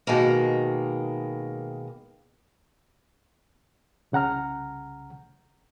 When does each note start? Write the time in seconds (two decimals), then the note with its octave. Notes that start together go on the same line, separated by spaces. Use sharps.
0.07 B2 D#3 G#3 A#3
4.12 C2 C#3 F#5 A#5 F6